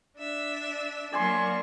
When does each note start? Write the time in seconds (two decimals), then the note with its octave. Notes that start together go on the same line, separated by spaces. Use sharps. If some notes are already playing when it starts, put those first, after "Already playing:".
0.18 D4 E5
1.12 F#3 A#3 D5 G#5 C6 C#6